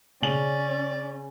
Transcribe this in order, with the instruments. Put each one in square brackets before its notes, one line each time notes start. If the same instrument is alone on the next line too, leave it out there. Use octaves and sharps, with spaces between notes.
[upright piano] C#3 G#5 F#7 [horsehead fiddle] C#4 [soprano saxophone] D5